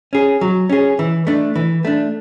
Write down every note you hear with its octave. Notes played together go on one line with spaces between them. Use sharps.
C#4 G#4
F#3
C#4 G#4
E3
A3 D4
E3
A3 D4